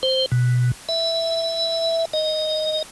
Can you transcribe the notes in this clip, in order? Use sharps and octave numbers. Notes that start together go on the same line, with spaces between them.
C5
B2
E5
D#5